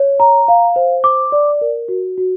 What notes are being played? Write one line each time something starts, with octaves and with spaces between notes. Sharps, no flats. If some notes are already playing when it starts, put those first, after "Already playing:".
Already playing: C#5
A#5
F5
C5
D6
D5
A#4
F#4
F#4